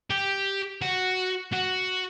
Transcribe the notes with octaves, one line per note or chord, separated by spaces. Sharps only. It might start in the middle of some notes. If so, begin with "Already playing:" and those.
G4
F#4
F#4